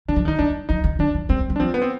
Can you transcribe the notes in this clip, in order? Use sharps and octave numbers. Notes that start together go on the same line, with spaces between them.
D#3 D4
F3
D#3
D#4
G3 D4
F3 D#4
D#3
D#3 D4
F3
G3 C4
G3
D4
F3 C4
B3
C4